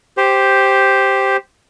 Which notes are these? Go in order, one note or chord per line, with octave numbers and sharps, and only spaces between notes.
G4 C5